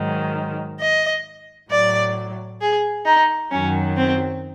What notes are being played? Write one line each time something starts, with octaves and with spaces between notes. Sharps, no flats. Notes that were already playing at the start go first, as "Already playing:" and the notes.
Already playing: G#2 D#3 F#3
D#5
A2 F#3 D5
G#4
D#4
F#2 D#3 F#3 C#4
C4